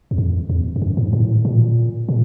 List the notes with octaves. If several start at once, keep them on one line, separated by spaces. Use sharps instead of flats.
E2
F2
E2
F2
F#2
G#2
A2
A#2
A#2